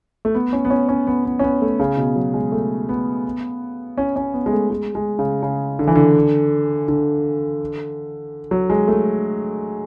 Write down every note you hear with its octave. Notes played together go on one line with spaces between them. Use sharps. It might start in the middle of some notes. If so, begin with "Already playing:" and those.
A3
B3
C#4
B3
C#4
C#4
B3
B3
C#4
B3
A3
C#3
B2
F#3
G#3
A3
B3
C#4
C#4
B3
G#3
A3
G#3
G#3
C#3
C#3
D3
E3
D3
D3
F#3
G#3
A3